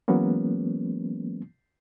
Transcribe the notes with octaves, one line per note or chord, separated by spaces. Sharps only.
E3 F#3 G#3 A#3 B3 C#4